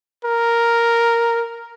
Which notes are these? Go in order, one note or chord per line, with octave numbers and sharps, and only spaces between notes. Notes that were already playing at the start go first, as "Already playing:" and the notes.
A#4